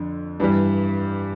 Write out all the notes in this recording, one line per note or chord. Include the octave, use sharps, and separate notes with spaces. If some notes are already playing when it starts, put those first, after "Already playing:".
Already playing: F2 D3 D4
G2 E3 G3